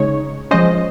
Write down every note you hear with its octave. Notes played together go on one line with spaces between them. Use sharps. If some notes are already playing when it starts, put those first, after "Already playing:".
Already playing: C#3 G#3 D#4 C#5
F3 G#3 C#4 C5 D#5